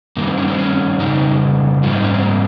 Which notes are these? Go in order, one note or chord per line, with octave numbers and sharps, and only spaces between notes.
G2 D#3 G3 A#3
C4
C#4
C4
C#4
F2 C#3 G3 D#4
G#2 G3 F4
D#4
C#4
C4
A#3